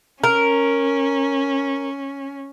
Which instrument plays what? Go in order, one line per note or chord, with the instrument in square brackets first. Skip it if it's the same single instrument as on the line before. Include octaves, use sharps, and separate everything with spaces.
[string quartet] C#4 [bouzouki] A#4